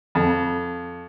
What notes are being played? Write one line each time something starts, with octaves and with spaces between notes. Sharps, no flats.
F2